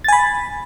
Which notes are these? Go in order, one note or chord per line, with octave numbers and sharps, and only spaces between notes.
G#5 B5 A6